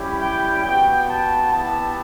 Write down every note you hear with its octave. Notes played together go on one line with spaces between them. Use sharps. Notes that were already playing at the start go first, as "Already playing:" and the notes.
Already playing: G3 C#4 E4 G4
G5
B3 F#4 G5
A5
B3 E4 G4 A5